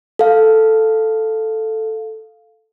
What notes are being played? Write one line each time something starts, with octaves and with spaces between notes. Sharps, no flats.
A4 F5